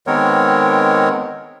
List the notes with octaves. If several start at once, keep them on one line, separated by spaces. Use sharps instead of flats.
D#3 G#3 B3 C4 A#4 C#5